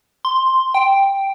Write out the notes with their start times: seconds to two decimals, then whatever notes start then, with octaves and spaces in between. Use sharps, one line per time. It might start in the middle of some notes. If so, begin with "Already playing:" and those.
0.25 C6
0.74 G5